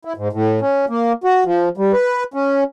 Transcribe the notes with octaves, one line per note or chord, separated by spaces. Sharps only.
E4
G#2
A2
C#4
A#3
F#4
F3
G3
B4
C#4